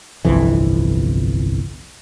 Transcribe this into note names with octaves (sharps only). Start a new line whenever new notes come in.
G1 C2 F2 E3